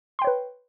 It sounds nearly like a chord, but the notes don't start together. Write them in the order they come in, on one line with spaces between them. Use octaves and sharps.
C6 G5 C#5 B4